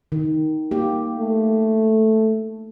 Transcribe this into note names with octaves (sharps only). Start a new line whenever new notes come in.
D#3
A#3 G4
A3